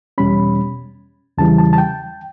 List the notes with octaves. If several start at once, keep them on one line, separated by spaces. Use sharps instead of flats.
E2 B2 G3 C#4 B5
E2 C#3 E3 G3 A5
A5
A5
G5